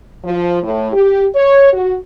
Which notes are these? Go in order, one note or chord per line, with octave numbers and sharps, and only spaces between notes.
F3
A2
G4
C#5
F#4